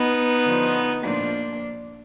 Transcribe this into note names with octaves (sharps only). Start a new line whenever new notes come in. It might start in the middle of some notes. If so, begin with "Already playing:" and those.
Already playing: B3 D#4
D3 F3
A#2 F3 A#3 D4